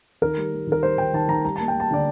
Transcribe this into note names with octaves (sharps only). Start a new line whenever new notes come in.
D#3 A#4
G3
G3
D#3 A#4
G3 C5
D#3 G5
D#3 A5
D#3 A#5
G3 A#5
A#3 A5
G5
G3
A5
D3 D5